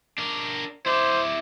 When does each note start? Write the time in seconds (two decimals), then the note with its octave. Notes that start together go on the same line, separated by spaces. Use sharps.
0.18 D4 A#4
0.86 E4 C5 D5